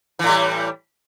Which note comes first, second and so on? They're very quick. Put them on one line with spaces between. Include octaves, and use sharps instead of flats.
E3 A2 G3